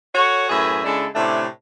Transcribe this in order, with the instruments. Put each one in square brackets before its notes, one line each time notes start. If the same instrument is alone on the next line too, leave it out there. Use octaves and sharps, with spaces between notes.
[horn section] F#4 A4 C#5
F#2 A2 G#4 B4 E5
C#3 G#3 D4 E4 A4
A2 C3 A3 C#4 D4